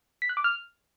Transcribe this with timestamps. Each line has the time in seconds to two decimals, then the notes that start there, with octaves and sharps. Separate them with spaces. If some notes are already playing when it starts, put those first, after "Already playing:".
0.22 B6
0.29 F#6
0.37 D6
0.44 F6